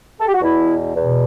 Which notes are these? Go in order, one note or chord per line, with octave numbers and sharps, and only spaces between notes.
A4
G4
F#4
E2 B2 E4
E2 B2